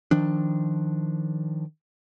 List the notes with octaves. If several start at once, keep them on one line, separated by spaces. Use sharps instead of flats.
D#3 F3 D4